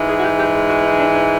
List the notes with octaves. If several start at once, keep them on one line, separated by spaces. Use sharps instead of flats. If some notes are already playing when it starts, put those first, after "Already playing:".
Already playing: G#2 E3 G#3
G#4
F#4
G4
G4
G#4
F#4
D#4
D4
D4